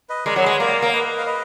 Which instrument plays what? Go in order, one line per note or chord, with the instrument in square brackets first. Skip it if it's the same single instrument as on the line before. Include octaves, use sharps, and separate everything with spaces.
[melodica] B4 D#5
[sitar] G#3 [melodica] A#4 D5
[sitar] F#3
[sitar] G#3 [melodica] G#4 B4
[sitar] A#3 [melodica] A#4 D5
[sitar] A#3
[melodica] B4 D#5
F5
B4 D#5